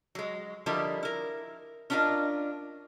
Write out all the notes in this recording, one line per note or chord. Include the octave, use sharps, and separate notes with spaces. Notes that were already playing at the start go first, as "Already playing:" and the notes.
F#3 G#3
D3 F3 G3 E4 A#4 D#5
E4 A#4
C#4 D4 F4 G#4 A#4 D#5